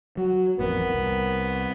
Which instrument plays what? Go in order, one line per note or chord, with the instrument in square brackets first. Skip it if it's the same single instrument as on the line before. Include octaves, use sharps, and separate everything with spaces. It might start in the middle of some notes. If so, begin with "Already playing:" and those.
[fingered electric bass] F#3 [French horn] F#4
[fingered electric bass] A1 F2 A2 [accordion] B3 [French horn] A#4
[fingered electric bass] C2